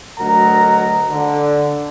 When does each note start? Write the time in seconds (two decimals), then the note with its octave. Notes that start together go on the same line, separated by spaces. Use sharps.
0.19 D2 F#3 A#4 D#5 F#5 A#5
1.11 D3